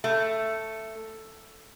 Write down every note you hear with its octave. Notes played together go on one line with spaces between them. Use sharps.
A3